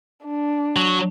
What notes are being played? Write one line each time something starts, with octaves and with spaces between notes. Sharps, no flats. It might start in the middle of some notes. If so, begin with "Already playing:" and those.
D4
F#3